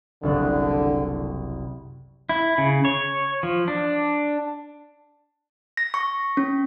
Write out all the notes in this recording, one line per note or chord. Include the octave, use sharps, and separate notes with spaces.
F#1 C2 D3 F#6
E4
C#3
C#5
F3
D4
A#6
C#6
C#4